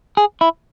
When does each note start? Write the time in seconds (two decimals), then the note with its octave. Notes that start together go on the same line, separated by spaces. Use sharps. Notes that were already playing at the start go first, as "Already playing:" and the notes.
0.17 G#4
0.41 E4